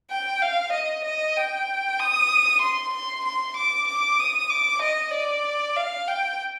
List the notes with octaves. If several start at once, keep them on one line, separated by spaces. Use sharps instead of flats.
G5
F5
D#5
D#5
G5
D#6
C6
C6
C6
D6
D6
D#6
D6
D#5
D5
F5
G5